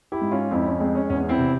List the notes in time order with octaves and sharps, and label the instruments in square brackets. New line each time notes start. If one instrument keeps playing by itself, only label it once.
[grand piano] E4 G4
G#2
C#4 F4
F2 C4 E4
C#4
G#3 C4
C#4
E2 C#4
C#4
C4 E4
C3